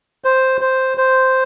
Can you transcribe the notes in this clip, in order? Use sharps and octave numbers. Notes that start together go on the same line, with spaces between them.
C5
C5
C5